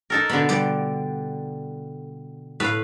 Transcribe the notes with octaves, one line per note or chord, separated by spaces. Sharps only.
D#4 A4 A#4
B2 D3 B5
G3 D5
A2 B4 F5